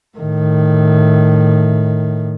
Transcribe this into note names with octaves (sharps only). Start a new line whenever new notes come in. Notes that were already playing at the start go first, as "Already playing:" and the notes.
A2 D#3